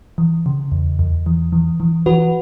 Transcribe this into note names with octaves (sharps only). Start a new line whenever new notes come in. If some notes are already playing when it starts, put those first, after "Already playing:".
E3
C#3
E2
E2
E3
E3
E3
E3 F#4 B4